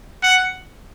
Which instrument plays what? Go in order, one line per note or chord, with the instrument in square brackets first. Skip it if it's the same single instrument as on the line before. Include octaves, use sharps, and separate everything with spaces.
[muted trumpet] F#5